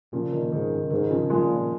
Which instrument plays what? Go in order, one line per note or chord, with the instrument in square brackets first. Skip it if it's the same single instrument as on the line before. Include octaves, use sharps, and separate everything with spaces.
[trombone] A#2 [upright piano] C#3 F3
[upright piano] D#3
[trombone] G#2 [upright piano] D#3
[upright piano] C#3
[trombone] G#2 [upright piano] D#3
[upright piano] C#3 F3
[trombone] A#2 [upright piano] F3 G#3